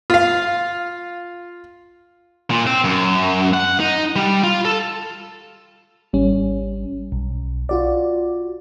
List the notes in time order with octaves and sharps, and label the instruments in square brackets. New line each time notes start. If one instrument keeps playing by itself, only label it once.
[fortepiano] F4 F5
[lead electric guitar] A#2
C4
F#2
F#5
D#4
G3
F4
A4
[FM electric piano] G#1 G3 C#4
B1
F4 F#4 D5